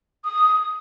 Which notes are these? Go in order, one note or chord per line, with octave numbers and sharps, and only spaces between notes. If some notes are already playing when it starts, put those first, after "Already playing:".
D#6